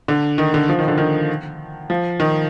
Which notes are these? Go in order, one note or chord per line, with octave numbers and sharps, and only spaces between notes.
D3
D#3
D3
F3
D#3
D3
D#3
F3
D#3